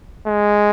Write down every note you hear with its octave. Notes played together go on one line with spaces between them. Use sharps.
G#3